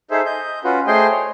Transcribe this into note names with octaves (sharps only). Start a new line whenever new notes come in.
D#4 G#4 A4 C5 E5
D#5 G6
C#4 F4 F#4 B4
A3 G#4 C5 D#5 G5 C6
C#5